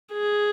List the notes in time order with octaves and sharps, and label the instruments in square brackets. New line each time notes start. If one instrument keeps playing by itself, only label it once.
[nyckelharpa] G#4